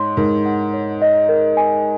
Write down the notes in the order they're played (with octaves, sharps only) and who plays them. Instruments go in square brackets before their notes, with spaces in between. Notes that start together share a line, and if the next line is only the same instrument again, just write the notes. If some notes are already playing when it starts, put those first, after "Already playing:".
Already playing: [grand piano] G#2 [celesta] C#5 C6
[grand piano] G#2 [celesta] A#4
[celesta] F#5
C#5
D#5
A#4
G#5